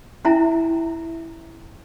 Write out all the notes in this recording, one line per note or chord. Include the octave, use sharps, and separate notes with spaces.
C#4 E4 E5 G#5 A#5